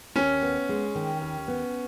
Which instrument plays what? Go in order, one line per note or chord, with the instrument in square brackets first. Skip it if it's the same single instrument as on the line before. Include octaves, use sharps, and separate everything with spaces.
[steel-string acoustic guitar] D#2 [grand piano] C#4
[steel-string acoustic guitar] B3
G#3
D#3
D#2
B3